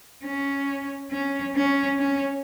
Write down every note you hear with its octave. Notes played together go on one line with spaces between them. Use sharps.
C#4
C#4
C#4
C#4